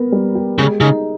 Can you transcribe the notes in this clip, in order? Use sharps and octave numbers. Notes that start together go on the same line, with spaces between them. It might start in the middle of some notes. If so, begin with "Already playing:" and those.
Already playing: B3 A#4
G3
G4
C#3 G#3
C#3 D#4